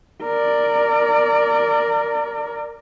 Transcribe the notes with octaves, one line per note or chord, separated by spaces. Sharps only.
A#4 D5